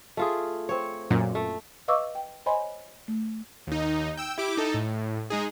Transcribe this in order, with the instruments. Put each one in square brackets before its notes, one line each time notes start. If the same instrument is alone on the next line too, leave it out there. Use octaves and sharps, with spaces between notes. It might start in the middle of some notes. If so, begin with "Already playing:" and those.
[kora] A3 F4 G#4
C4 C#5
[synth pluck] F#2 A#2
[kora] A3
[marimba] B4 D#5 F5 C#6 D6 E6
G5
C5 C#5 D#5 G#5 B5 C6
A3
[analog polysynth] D#2 D#4
G5 E6
E4 G4 D6
D#4 A4
A2
G#3 D#4 G#4